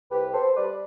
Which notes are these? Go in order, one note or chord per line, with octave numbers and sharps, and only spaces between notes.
C2 G4 B4
B3 A4 C5
G3 B4 D5